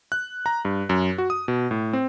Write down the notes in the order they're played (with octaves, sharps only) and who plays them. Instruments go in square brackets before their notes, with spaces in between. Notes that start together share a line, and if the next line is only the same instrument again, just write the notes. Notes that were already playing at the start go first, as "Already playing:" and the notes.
[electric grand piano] F#6
A#5
G2
F#2
F#4
D#6
B2
A2
C4